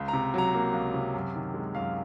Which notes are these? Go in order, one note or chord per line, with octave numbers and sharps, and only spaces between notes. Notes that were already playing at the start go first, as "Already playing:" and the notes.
Already playing: C#2
A#5
C3
F#3 A#5
A#3
C#2
C3
F#2
D#3
G#3
F#2 F5